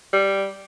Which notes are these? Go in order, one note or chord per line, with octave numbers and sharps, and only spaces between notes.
G3